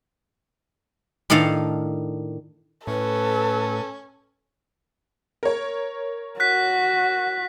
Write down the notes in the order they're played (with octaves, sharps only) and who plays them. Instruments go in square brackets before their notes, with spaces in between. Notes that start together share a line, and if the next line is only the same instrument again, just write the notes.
[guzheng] A2 D#3 D4 A4 F5
[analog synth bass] A2 [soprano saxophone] C#4 [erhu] A4 [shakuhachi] B4
[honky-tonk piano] A#4 C#5
[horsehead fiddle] F#4 [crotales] F#6 B6